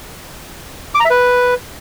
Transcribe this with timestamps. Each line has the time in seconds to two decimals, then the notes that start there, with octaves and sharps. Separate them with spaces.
0.95 D6
1.00 A#5
1.05 E5
1.10 B4